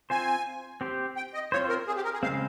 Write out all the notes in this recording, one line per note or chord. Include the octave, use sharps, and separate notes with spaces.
C4 F4 C5 G#5
C4 G4 C5
G5
D#5
C4 F4 C5 C#5
A#4
G#4
G4
A#4
G#4
C#3 G#3 C4 F5